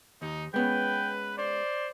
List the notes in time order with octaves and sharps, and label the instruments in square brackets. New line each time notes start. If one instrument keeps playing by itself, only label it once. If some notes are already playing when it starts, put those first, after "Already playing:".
[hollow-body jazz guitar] D#2 [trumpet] D#4
[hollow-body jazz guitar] G#3 B3 C#4 [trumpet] B4 [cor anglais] G5
[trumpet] C5 [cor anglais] D5